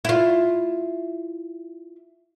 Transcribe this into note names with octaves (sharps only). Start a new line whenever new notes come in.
E4 F4